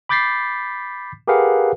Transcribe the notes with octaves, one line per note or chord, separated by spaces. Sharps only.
B5 D6 G6 A6 B6 C7
G4 G#4 A#4 B4 F5 F#5